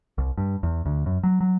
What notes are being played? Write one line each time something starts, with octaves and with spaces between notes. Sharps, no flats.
C2
G2
E2
D2
F#2
F#3
F#3